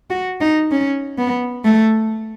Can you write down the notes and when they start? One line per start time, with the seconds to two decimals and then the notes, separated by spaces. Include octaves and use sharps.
0.10 F#4
0.41 D#4
0.71 C#4
1.18 B3
1.65 A3